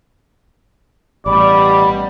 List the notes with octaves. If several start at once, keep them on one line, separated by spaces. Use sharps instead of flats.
A1 B2 G3 D5 B5